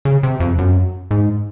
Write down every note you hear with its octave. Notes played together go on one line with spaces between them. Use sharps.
C#3
C3
F2
F#2
G#2